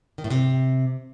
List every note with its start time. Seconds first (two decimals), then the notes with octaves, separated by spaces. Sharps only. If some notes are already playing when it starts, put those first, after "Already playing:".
0.18 D#3
0.24 A2
0.30 C3